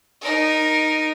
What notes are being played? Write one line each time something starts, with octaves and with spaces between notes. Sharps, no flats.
D#4 A#4